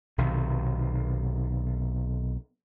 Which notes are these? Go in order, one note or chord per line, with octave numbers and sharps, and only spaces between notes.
B1 C3 D#3